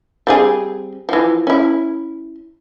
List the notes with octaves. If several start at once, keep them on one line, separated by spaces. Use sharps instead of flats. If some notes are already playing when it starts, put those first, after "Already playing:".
G3 C4 G#4
E3 F3
C#4 E4